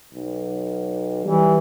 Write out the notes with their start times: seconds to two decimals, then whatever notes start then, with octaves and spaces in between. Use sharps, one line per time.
0.14 B1
1.24 E3 G3